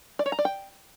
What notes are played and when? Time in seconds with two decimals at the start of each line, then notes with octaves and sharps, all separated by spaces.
0.19 D5
0.26 C#5
0.32 A#5
0.39 D5
0.45 G5